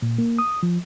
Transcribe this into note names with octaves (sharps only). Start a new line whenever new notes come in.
A#2
A#3
D#6
F3